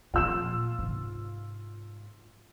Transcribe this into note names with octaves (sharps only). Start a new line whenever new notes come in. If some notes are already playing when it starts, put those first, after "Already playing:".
A#2 F3 F4 E6 E7
G#2 C3